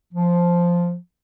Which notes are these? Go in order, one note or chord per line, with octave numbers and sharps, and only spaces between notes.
F3